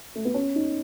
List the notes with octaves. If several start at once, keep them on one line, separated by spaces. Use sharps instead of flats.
A3
B3
C#4
D#4